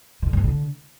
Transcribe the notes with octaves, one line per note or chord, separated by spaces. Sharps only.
D3
G2
D3